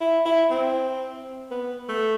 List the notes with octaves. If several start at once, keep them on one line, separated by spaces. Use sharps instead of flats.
E4
E4
C4
B3
A3